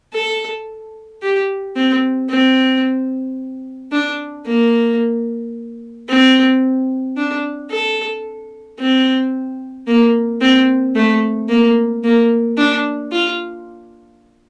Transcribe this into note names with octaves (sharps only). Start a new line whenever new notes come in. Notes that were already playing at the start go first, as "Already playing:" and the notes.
A4
G4
C4
C4
D4
A#3
C4
D4
A4
C4
A#3
C4
A3
A#3
A#3
D4
F4